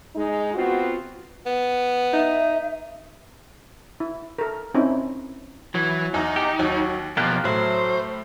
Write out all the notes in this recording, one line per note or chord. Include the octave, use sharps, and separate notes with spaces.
G#3 D#4
B3 C4 F4 F#4
B3
D#4 E5
E4
A4 A#4
C4 C#4 D#4 E4
E3 F#3
E2 D#4
G4
D#2 F#3
B2 F3 A#3 G4 F6 F#6 A6
A2 F#3 C5